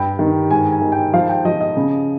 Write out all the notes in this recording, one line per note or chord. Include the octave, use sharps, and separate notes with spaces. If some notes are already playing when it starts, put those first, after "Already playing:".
Already playing: G2 G5
D#3
G#2 G#5
G#5
D#3
G5
F3 F5
G5
F3 D#5
D#5
C#3